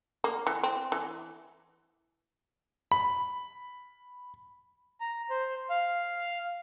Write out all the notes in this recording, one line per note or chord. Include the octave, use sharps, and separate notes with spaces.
A#3
E3
C4
E3
B5
A#5
C5
F5